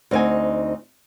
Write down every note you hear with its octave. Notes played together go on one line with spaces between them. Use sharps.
D2 C4 D#4 D#5 G#5